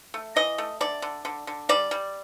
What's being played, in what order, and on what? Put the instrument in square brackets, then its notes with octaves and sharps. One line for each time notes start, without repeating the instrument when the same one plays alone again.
[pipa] A3
E3 D#5
A3
D3 D5
D3
D3
D3
G3 D5
G3